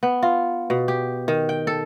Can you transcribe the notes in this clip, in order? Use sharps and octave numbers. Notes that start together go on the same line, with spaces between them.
B3
F4
B2
G4
D#3
G5
A4